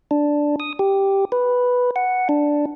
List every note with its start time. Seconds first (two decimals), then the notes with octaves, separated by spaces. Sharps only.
0.11 D4
0.60 D#6
0.79 G4
1.32 B4
1.96 F#5
2.29 D4